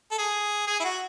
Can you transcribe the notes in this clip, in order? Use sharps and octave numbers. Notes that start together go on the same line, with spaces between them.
A4
G#4
G#4
E4
F#4